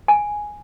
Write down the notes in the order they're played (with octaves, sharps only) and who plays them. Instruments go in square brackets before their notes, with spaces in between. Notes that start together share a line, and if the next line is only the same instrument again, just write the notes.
[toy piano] G#5